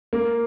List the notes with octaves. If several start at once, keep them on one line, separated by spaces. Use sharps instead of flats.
A#3